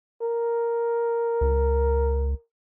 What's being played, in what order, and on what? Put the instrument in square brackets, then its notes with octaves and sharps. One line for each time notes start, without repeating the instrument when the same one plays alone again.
[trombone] A#4
[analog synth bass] C#2